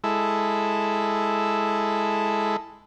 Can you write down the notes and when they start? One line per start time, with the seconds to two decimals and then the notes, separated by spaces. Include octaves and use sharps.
0.04 G#3 E4 A4